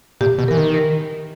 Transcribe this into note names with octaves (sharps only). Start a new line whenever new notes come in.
A#2 G4
B2
E3 A#4
D#3
A#4